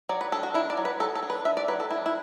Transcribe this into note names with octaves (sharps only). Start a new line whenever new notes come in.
F#3 D5
B4
D4 A4
F#4
D4 E4
D5
F#3
B4
F#3 A4
A4
D4
B4
D4 E5
D5
F#3 B4
A4
D4 E4
E4